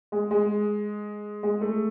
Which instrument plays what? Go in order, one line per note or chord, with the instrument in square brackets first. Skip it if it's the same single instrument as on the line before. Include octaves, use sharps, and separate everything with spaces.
[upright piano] G#3
G#3
G#3
A3